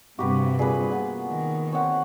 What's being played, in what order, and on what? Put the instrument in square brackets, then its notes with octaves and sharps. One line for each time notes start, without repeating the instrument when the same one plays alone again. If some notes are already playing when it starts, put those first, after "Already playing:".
[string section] G2 C3 [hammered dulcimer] C4 B4 F5 [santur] F#4 G4
[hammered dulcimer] A#2 B4 [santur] G#4
[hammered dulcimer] A#2 B3
[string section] D#3
[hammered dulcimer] C4 F#5 [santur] C#5